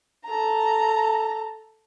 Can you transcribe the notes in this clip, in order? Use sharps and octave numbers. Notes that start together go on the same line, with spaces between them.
A4 A#5